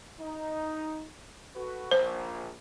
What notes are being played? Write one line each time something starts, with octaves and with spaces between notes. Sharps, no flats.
D#4
F#4 A4 B4
A#1 C5